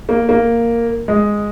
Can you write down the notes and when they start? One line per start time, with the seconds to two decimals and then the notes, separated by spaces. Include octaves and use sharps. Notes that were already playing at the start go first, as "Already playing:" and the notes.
0.09 A#3
0.29 A#3
1.08 G#3